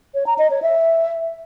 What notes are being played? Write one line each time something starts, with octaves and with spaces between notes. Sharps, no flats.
C#5
A#5
D#5
C#5
E5